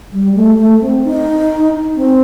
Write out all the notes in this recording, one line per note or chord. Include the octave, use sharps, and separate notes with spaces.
G3
A3
A3
C4
D#4
C4